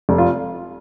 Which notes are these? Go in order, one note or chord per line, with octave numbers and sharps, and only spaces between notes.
F1
F4